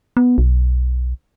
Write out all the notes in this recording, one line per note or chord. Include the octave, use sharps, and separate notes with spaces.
B3
B1